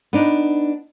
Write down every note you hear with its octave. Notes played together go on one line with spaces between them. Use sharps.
B3 D4 D#4